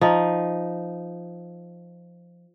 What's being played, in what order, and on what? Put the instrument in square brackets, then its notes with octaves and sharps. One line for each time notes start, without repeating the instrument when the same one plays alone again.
[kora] F3 D#4